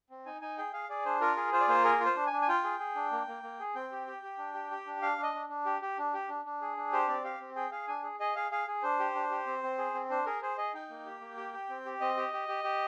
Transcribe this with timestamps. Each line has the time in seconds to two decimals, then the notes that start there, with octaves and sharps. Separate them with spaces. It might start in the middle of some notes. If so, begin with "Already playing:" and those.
0.10 C4
0.26 D#4 G#5
0.41 D#4 G#5
0.58 G#4 G5
0.73 G#4 F5
0.89 G#4 D5
1.05 D4 C5
1.21 F4 A#4
1.37 G#4
1.52 F4 C5
1.60 D5
1.68 A#3 C5
1.84 G#4 A#4
2.01 F4 C5
2.16 D4
2.27 G#5
2.32 D4
2.42 G#5
2.48 F4 G5
2.64 G#4
2.80 G#4
2.95 D4
3.11 A#3
3.27 A#3
3.43 A#3
3.59 G#4
3.75 C4 G5
3.91 G4
4.07 G4
4.22 G4
4.38 D4
4.54 G4
4.71 G4
4.86 D4
5.02 D4 F5
5.18 D4 D#5
5.34 D4
5.49 D4
5.66 G4
5.82 G4
5.98 D4
6.13 G4
6.29 D4
6.45 D4
6.61 G#4
6.77 D4
6.92 G4 C5
7.08 C4 D5
7.24 G4 F5
7.40 C4
7.56 G#4 G5
7.72 G#4 F5
7.88 D4 G#5
8.03 G#4
8.20 G#4 D#5
8.36 G#4 F5
8.51 G#4 F5
8.67 G#4
8.83 D4 C5
9.00 G4
9.15 D4
9.31 G4
9.47 C4
9.63 C4
9.78 G#4
9.94 C4
10.10 D4 C5
10.26 G#4 A#4
10.42 G#4 C5
10.57 G#4 D#5
10.74 D#4 G5
10.90 A#3
11.06 G4
11.21 A#3
11.37 G4
11.53 G4
11.69 C4
11.86 G4
12.01 C4 D#5
12.17 G4
12.33 G4
12.48 G4
12.64 G4